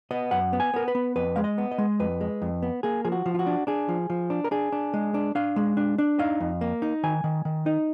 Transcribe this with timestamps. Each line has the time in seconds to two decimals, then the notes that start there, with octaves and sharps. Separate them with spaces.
0.11 B3 D#5
0.31 F#2 F#5
0.53 B3
0.60 G#5
0.74 B3 A#4
0.88 B4
0.95 B3
1.16 F2 B4
1.36 G#3 F5
1.44 D#5
1.58 B3
1.71 D#5
1.78 G#3
2.00 F2 B4
2.21 G#3
2.42 F2
2.62 B3
2.83 A#3 G#4
3.05 F3 G#4
3.12 F#4
3.26 F3
3.34 F4
3.39 F#4
3.47 D4
3.67 D4 G#4
3.89 F3
4.10 F3
4.30 D4
4.44 A#4
4.51 D4 G#4
4.72 D4
4.94 G#3
5.14 D4
5.35 D4 F5
5.56 G#3
5.77 D4
5.98 D4
6.19 D#4 F5
6.40 F2
6.61 A#3
6.82 D#4
7.03 D#3 G#5
7.24 D#3
7.45 D#3
7.66 D#4